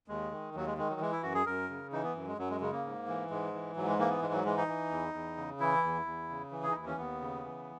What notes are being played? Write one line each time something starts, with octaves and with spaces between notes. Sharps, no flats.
D#2 G#3
D#3
D#2 F#3
G#3
D#3 G#3
F#3
E3 G#3
E4
F#2 F#4
G#4
F#2 A#4
C#3
E3 D#4
B3
F#2
G#3
F#2 F#3
G#3
C#3 G#3
A#3
G#2
E3
G#2 G#3
E3
G#2 F#3
G#3
E3 A#3
B3
G#2 G#3
F#3
E3 G#3
D#4
E3
E2
E2
C#3
E3 E4
E2
E2
C#3
E3
G#4
D#4
D#2 E4
C#4
D#2 B3
C#3
E3